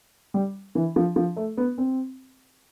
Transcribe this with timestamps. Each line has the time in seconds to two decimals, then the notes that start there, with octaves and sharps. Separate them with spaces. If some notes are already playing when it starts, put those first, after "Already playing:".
0.34 G3
0.75 E3
0.96 F3
1.16 F3
1.36 A3
1.57 B3
1.78 C4